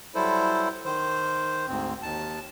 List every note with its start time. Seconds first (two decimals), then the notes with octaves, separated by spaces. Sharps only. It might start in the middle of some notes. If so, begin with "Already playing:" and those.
0.15 F#3 G3 E4 A4 C5
0.85 D#3 C5
1.68 D2 G#2 C4
2.02 D#2 A5